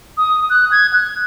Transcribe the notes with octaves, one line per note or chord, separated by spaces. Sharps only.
D#6
F#6
G#6
F#6